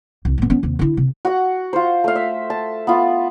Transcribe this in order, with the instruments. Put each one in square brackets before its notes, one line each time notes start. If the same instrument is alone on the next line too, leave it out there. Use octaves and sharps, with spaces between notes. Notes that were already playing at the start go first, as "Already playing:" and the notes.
[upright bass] C2
A2 B3
B3 C#4
D#2 C3
D3 E4
C3
[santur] F#4 F#5
F4 C5
A3 F5
E5
A5
B3 F4